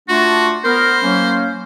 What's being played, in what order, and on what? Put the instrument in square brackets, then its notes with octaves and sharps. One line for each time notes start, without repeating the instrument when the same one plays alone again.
[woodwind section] A3 D4 F4 [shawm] F#4
[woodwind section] B3 A#4 [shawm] C5
[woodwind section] F#3 A#3 C#4